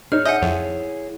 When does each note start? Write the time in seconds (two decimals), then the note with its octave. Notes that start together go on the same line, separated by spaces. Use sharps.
0.12 D#4 G#4 C#5 F6
0.26 D#5 E5 F#5 G#5 G6
0.42 F2 E4 G#4 C#5